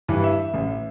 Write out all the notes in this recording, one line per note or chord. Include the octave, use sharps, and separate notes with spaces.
G2 E3
E5
A1